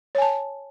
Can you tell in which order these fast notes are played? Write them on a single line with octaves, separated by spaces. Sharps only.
C#5 G#5 A5